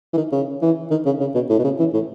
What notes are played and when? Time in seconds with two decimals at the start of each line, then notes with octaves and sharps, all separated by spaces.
0.13 E3
0.18 D#3
0.32 C#3
0.62 E3
0.91 D#3
1.06 C#3
1.20 C#3
1.35 B2
1.50 A2
1.59 B2
1.64 C#3
1.79 E3
1.94 A2